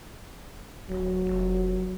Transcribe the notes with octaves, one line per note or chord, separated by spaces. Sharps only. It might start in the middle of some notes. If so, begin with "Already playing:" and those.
D1 F#3
F1